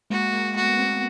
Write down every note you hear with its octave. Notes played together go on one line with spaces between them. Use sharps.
G#3 A#3 F#4
G#3 A#3
A3 B3 F#4
A#3 C4